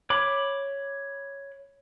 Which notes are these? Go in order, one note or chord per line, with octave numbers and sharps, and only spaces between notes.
C#5 B5 D6